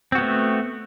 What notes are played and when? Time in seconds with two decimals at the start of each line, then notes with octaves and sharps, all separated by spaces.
0.12 C4
0.15 F#4
0.18 B3
0.21 A3